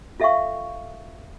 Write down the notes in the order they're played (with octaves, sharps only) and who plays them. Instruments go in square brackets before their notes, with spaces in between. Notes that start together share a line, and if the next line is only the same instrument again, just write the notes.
[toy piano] F4 A4 E5 F5 G5 C#6